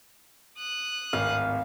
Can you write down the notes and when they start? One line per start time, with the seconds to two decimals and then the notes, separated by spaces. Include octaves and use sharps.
0.57 D#6 F#6
1.13 D1 G#1 F5 F6